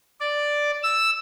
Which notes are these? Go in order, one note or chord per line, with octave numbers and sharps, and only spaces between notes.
D5
E6